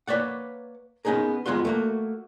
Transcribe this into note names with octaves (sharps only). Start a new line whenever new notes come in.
A#3 B4 C#5 D5 F#5
B3 C#4 D#4 G#4 A#4
F2 G#3 B3 F4 F#4 C6
A3 A#3 F#4